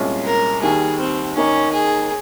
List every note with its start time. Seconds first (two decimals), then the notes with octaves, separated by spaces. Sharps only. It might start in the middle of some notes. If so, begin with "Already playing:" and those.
Already playing: C2 A#2 G#3 C#4 F4
0.26 A#4
0.62 D#2 D#3 G3 G#4
1.00 C4
1.36 D#2 D#3 A#3 C#4 D#4
1.73 G#4